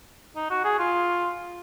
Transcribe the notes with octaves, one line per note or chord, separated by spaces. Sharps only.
D#4
F#4
G#4
F4